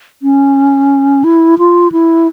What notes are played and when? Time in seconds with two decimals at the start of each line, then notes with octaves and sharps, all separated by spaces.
0.22 C#4
1.24 E4
1.59 F4
1.92 E4